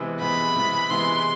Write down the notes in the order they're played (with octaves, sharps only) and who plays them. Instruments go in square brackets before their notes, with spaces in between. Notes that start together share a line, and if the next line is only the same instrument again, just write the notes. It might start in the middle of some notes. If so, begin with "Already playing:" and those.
Already playing: [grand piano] C3 E3 G#3 B3
[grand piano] C3 E3 G#3 B3 [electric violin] B5
[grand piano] C3 E3 G#3 B3
[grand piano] C3 E3 G#3 B3 [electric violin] C6